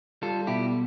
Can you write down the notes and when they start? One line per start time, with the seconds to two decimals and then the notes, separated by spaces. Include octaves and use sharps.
0.22 G3 F4 A4
0.47 B2 E4 G4